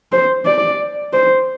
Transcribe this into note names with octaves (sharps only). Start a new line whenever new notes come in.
C5
D5
C5